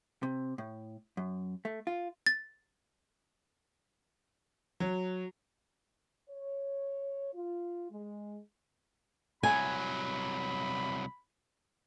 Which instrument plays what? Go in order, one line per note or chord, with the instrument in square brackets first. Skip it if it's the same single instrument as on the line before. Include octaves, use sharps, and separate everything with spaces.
[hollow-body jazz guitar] C3
A2
F#2
A3
F4
[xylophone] A6
[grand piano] F#3
[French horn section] C#5
F4
G#3
[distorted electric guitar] C2 F#3 [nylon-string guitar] G#5 [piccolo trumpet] B5